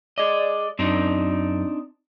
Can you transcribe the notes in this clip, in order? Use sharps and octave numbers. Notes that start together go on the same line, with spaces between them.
G#4 D5 D#5
F#2 C4 D4 D#4